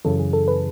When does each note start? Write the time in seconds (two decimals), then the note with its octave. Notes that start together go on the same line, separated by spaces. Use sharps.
0.05 F#2 C#3 E3 A4
0.19 G#4
0.33 A4
0.48 B4